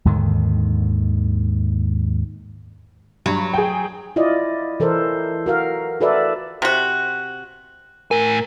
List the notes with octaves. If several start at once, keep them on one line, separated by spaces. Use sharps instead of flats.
D#2 G#2 D3 D#3
G2 F#3
G#4 G5
E4 F4 D5 D#5
E3 A4 A#4 C5
F#4 A#4 F5
F#4 A4 B4 D5 E5
C3 F#4
A2 A#4 G#5